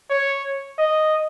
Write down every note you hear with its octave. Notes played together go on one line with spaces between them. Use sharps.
C#5
D#5